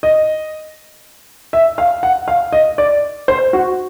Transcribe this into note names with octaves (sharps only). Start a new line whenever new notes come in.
D#5
E5
F5
F#5
F5
D#5
D5
C5
F#4